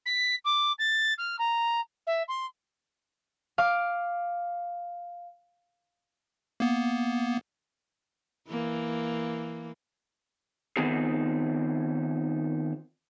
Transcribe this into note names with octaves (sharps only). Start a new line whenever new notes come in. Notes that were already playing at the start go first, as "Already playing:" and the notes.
B6
D6
A6
F6
A#5
E5
C6
F5 D6
A#3 B3
E3 A#3
D#3 B3 C4 D#4 F4 G#4